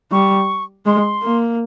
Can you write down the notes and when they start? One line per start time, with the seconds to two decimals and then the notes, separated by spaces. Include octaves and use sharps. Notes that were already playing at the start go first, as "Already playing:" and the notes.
0.12 G3 C#6
0.86 G#3 C6
1.23 A#3